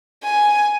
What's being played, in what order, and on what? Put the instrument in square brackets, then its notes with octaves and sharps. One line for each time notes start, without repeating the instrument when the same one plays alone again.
[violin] G#5